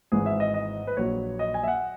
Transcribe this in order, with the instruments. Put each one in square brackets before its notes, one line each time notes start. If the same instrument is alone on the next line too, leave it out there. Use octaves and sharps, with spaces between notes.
[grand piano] G#1 G#2 E3 G#4
E5
D#5
D#5
B4
A#1 A#2 F#3 C#5
D#5
G#5
E5
F#5